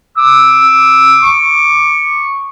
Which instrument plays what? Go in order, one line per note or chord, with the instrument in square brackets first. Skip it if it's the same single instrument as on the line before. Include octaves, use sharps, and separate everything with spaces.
[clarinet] D6 [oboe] E6
[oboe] C#6